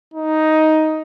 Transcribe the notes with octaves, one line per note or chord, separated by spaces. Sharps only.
D#4